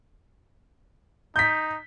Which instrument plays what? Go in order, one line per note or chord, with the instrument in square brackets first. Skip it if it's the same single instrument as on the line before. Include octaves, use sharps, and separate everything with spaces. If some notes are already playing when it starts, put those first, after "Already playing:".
[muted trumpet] D#4 [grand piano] G6 B6